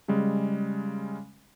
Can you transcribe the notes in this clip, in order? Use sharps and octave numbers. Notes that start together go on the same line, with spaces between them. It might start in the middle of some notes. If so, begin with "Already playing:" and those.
C#3 G3 G#3